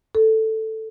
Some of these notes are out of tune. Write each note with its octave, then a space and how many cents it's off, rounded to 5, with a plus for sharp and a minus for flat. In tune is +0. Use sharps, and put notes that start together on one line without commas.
A4 +5